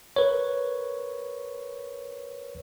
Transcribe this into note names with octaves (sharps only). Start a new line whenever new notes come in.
A#4 B4 C#5